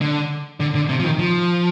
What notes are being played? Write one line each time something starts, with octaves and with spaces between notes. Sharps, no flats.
D3
D3
D3
C3
F3
D#3
F3